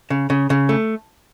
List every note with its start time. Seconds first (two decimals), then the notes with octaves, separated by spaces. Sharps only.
0.10 C#3
0.30 C#3
0.50 C#3
0.69 A3